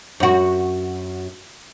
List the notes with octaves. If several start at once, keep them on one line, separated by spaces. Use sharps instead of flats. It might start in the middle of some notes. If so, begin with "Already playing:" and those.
F#2 F#4